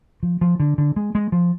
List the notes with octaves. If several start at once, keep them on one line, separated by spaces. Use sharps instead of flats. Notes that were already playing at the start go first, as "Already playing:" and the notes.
F3
F3
D3
D3
G#3
G#3
F3